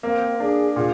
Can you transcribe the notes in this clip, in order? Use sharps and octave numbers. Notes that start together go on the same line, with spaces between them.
A#3 C4
D4 G#4
A#2 G#4